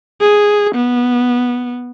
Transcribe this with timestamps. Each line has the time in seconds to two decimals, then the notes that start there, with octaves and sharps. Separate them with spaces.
0.21 G#4
0.75 B3